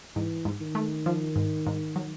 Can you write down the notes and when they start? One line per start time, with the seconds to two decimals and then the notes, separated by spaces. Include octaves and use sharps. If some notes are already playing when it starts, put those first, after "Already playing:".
0.16 G#2 E3
0.45 G#2
0.61 D#3
0.75 A3
1.06 F3
1.36 G#2
1.67 G#2
1.96 F#3